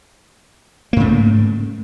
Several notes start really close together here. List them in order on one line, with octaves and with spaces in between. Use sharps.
A#3 G#2 C#3 A3